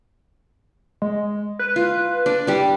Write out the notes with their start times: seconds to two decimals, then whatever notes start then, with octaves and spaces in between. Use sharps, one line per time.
1.02 G#3
1.59 B4
1.76 F4
2.26 D4
2.47 G3 D4